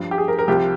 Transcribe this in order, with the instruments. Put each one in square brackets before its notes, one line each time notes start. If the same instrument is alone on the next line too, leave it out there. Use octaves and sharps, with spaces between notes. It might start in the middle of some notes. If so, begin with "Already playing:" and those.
Already playing: [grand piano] G2 F3
G4
G#4
A#4
A#4
C2 C3 F3 G4